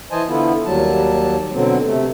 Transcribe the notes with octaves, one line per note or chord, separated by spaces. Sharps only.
E3 C5 D#5 G#5 A5
D3 B3 E4 F4
D#2 F#3 G3 A5
B2 D3 F#3 C4
C3 A3